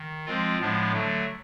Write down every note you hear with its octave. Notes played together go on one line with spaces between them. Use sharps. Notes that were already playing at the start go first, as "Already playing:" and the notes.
Already playing: D#3
F3 G#3 C4 F4
A2 F3 G#3 B3 D4
D3 F#3 A3